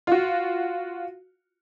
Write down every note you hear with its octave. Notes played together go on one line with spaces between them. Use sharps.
F4 F#4